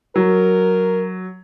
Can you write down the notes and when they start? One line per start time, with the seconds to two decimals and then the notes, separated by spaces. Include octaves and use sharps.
0.16 F#3 A#4